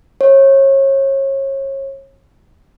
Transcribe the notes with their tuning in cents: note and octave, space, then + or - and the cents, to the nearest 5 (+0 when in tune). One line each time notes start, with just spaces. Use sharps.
C#5 -30